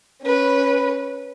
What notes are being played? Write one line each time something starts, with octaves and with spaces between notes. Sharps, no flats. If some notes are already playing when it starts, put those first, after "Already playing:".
C#4 B4